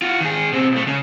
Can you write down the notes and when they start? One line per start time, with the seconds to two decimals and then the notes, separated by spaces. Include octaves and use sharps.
0.02 F4 F#4
0.21 D#3 G#4
0.52 B2 C4
0.72 B1 A3
0.87 C#3